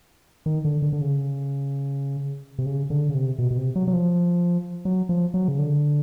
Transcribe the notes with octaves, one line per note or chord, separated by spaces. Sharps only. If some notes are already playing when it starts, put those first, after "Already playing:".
D#3
D3
D3
D3
C#3
C3
C#3
D3
C#3
C3
B2
B2
C3
F#3
F#3
F3
F#3
F3
F#3
C#3
D3